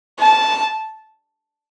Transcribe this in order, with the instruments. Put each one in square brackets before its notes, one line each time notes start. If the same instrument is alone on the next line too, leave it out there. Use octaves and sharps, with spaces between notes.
[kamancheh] A5